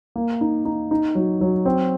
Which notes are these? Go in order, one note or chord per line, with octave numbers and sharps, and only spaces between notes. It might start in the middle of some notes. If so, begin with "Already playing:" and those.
A#3
D#4
D#4
D#4
F#3
F#3
C4